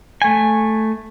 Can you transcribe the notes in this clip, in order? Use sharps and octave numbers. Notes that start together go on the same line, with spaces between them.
A3 G#5